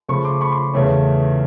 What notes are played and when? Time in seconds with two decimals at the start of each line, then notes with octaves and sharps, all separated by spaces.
0.08 C#3 F3 A3 B5 C#6
0.25 C6 D6
0.41 B5 C#6
0.51 C6 D6
0.74 E2 C#3 E3 A3 C#4